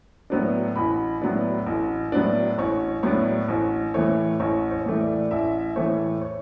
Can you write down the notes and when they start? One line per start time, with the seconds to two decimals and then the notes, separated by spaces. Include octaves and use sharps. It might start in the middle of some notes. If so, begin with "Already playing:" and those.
0.30 A2 F#3 B3 D4
0.76 A1 B5
1.22 A2 F#3 B3 D4
1.66 A1
2.12 A2 F#3 B3 D4
2.58 A1 C#5
3.03 A2 F#3 B3 D4 C#5
3.48 A1 C#5
3.94 A2 E3 A3 C#5
4.40 A1 C#5
4.71 C#5
4.86 A2 E3 A3
5.00 D5
5.31 A1 E5
5.76 A2 E3 A3 C#5
6.21 C#5